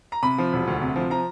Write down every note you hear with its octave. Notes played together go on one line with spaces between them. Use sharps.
A#5
C3 B5
F3
E1
D2
C3
F3
F3 A#5